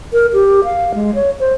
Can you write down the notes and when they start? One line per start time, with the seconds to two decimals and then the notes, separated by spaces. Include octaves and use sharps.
0.13 A#4
0.33 G4
0.65 F5
0.95 G#3
1.15 C#5
1.40 C5